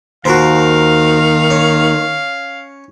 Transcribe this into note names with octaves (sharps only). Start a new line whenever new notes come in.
D#2 D#3 F#4 A#4 C5 F5
C#4